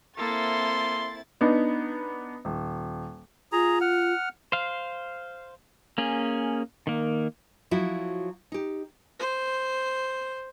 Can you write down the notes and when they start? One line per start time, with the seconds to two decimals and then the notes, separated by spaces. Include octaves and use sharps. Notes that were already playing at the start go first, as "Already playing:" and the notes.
0.18 A#3 C4 E4 A4 C6 A6
1.41 B3 D4 D#4
2.45 D#1
3.52 F4 G#4 A#5
3.81 F#5 F6
4.52 C5 F5
5.98 A#3 C#4 G#4
6.87 D#3 A#3
7.71 F3 F#3 E4 F#4
8.52 D#4 G4
9.19 C5